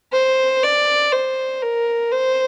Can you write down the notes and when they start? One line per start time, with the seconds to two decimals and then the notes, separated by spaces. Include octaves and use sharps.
0.13 C5
0.63 D5
1.12 C5
1.62 A#4
2.12 C5